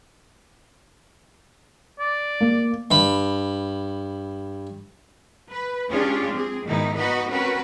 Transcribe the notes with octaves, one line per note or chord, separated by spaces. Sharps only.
D5
A#3
G2 B5
B4
G#3 C#4 D4 F4 G4 G#4
C4 G#4
G#2 B2 D#3 G#3 D#4 E4
B3 D#4 F#4 B4 D#5
C4 C#4 F#4 A#4 B4